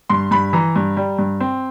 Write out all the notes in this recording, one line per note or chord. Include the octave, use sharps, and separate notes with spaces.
G2 C6
G2 B5
E3 A#5
G2
G3
G2
C4